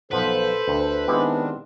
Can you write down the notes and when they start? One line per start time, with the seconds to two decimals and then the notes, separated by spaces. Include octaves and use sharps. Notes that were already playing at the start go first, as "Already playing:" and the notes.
0.12 B1 F3 A4 B4 C5 F#5
0.68 D2
1.08 D#3 G#3 B3 C4 D4 E4 G4